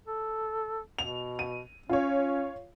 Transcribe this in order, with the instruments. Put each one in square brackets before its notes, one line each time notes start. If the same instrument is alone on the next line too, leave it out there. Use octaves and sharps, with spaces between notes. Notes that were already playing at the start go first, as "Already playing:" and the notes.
[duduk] A4
[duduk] B2 [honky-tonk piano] F7
[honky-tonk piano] D#7
[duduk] C#4 [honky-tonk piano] F4 C#5